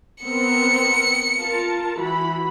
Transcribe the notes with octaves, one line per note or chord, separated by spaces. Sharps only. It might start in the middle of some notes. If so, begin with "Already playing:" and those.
B3 C4 A#4 C#7
F4 A#4 A5
E3 F#4 B5